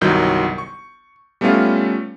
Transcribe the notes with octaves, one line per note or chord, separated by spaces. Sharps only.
G1 C2 D#3 F#3 G6
C#6
G3 A3 B3 C#4 F4